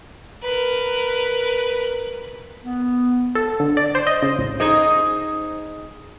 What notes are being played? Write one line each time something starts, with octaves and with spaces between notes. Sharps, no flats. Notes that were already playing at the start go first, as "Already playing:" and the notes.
A#4 B4
B3
A4
D3
D5
C5
D#5
C#3
A1
D#4 G#4 C5 D#5